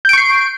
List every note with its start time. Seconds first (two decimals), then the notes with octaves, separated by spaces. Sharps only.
0.05 G6
0.09 D7
0.13 C#6
0.18 C7